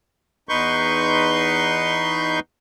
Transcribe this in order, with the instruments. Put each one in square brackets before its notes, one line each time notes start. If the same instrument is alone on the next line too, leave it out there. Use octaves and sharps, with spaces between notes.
[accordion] E2 D#4 B4 C6 C#6 G6